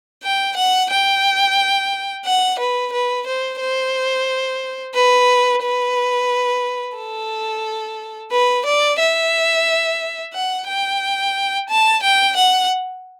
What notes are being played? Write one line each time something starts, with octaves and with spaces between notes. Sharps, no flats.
G5
F#5
G5
F#5
B4
B4
C5
C5
B4
B4
A4
B4
D5
E5
F#5
G5
A5
G5
F#5